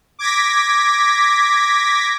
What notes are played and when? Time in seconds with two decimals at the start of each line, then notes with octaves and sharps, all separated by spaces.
0.19 D6 G#6 A#6 B6